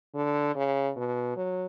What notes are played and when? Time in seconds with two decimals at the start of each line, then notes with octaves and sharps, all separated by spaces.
0.15 D3
0.55 C#3
0.97 B2
1.37 F#3